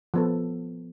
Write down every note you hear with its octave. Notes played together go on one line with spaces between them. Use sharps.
F3 B3 A4